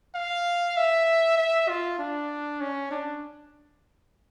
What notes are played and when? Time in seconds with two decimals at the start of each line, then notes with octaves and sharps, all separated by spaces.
0.15 F5
0.77 E5
1.37 E5
1.69 F4
1.99 D4
2.61 C#4
2.91 D4